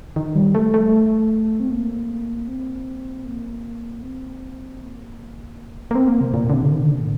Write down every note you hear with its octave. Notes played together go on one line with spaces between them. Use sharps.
D#3
G3
A3
A3
C4
A#3
C4
A#3
C4
A#3
A#3
C4
A#3
C3
A#2
D3
C3
D3
D#3
D3
C3
A2